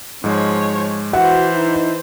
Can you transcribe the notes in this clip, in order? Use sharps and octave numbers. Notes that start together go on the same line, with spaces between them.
G#2 F3 G#3 C#5
E3 F#4 C5 E5 F#5
D#4 E4